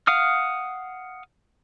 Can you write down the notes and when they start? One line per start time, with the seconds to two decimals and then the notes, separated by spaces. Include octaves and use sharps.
0.07 F5 F#5 D#6 F6